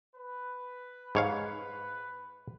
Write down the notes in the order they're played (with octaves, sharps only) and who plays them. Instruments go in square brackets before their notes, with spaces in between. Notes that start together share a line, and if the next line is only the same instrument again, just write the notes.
[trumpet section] B4
[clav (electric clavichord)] G#2 C#5 F5